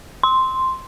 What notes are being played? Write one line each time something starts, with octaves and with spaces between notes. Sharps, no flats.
C6